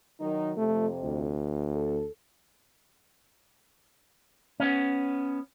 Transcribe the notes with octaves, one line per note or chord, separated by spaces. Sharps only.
D#3 F#3 D#4
F2 C3 A3
D2
A4
B3 C#4